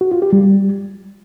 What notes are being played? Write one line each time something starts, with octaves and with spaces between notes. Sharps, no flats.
F#4
F4
G4
G3